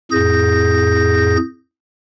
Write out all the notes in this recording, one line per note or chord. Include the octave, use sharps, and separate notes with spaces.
F2 A2 G#4 G6 A#6